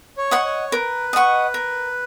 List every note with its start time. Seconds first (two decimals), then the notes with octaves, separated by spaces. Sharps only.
0.17 C#5
0.31 D#5 F#5 C#6
0.45 C#5
0.72 A#4 B4
1.13 D#5 F#5 C#6
1.54 A#4